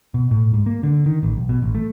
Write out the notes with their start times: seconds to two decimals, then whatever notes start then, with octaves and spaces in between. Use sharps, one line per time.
0.14 B2
0.31 A2
0.54 G#2
0.66 A#3
0.83 D3
1.06 D#3
1.23 A1
1.37 B1
1.49 B2
1.62 A1
1.75 A3